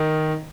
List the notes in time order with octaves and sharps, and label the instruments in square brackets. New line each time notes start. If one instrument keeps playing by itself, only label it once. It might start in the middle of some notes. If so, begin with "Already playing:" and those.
Already playing: [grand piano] D#3